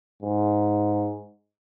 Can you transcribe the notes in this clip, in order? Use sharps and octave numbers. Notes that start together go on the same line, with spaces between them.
G#2